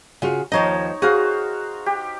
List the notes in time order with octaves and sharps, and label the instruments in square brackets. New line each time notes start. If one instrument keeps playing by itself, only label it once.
[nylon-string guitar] C#3 F4 F#4
[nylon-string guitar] D#2 F3 D#5 [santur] D#4 C#5
[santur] F#4 C5 F5 [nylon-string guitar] G#4
[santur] G4